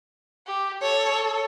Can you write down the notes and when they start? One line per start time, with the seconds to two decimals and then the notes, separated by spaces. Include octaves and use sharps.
0.47 G4
0.82 A4 C#5